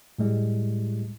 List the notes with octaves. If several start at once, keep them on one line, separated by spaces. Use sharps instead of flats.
A2 G3 G#3 E4